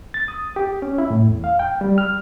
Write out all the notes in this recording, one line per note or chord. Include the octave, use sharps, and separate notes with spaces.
A6
D#6
G4
C#4
E4
A2
E2
F5
G5
G3
F6